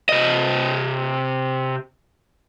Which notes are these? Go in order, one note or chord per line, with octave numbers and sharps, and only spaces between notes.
C3 D#5